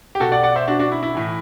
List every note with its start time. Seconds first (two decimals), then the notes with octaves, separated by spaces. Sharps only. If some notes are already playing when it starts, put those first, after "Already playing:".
0.15 G4
0.20 B2 F#4 A4
0.32 D5 F#5
0.43 D5 F#5
0.55 C5 E5
0.68 D4 F#4
0.79 D4 F#4
0.92 E4
1.03 E4
1.15 A2 E3